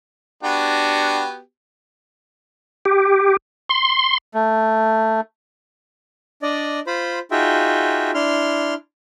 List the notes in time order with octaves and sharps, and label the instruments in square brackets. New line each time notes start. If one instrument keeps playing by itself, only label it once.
[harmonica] B3 F#4 G4 [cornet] D4
[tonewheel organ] G4
C6
[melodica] A3
[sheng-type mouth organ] D4 D5 D#5
F4 C5 B5
D#4 F4 F#4 G#4 E5 G5
D4 E4 C6 F6